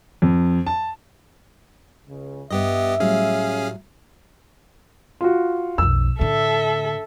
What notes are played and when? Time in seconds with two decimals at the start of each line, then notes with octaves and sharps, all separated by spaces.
0.22 F2
0.67 A5
2.08 C#2 C#3
2.50 G2 B3 G4 D#5 E5
3.00 A2 F#3 G3 C#4 G#4 F5
5.21 F4 F#4
5.78 B1 F2 E6
6.20 A2 D3 A4 E5